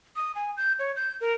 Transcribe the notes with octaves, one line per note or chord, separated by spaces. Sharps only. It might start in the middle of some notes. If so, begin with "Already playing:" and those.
D#6
G#5
G6
C#5
G6
A#4